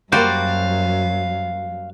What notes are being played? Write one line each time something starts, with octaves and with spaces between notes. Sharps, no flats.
F#2 G3 A#3 F#4 C5 D5 F5